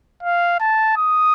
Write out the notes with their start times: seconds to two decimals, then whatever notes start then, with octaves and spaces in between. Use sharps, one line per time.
0.23 F5
0.60 A5
0.97 D#6